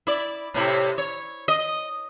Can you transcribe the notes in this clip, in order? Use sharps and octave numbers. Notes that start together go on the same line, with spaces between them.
E4 D5
A2 C3 E4
C#5
D#5